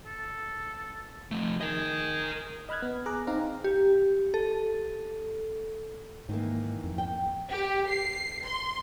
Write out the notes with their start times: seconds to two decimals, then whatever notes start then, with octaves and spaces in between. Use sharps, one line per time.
0.05 A4
1.31 F3 A3
1.61 G#4 A#4 D#5
2.69 D#5 B5 F6 F#6 G#6
2.82 B3
3.06 G#4 A#5 D6 F#6
3.27 C4 D#4 F5 A#5
3.64 G4
4.34 A4
6.29 G#2 D#3 E3 A#3
6.84 F2
6.98 G5
7.51 G4
7.90 C7
8.46 C6